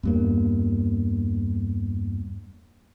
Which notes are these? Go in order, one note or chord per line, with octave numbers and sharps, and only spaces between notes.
E2 G2 A#3